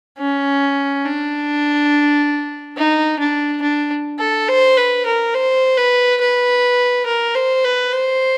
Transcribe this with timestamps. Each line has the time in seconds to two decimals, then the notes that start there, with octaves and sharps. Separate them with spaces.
0.19 C#4
1.05 D4
2.77 D#4
3.19 D4
3.62 D4
4.19 A4
4.49 C5
4.77 B4
5.06 A#4
5.35 C5
5.77 B4
6.21 B4
7.06 A#4
7.35 C5
7.64 B4
7.93 C5